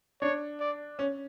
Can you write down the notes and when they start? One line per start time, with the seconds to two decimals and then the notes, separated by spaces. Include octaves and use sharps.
0.21 D4 C#5
0.60 D5
0.99 C#4